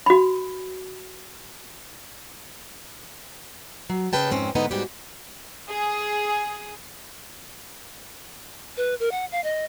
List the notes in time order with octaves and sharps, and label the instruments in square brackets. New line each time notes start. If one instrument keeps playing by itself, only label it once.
[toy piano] F#4 B5
[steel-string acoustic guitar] F#3
D#2 C#3 B4 G5 A5
F2 G#2 C4 C#4
G#2 D3 B3 D#4
G#2 G3 F#4 G4
[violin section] G#4
[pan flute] B4
A#4
F#5
F5
D#5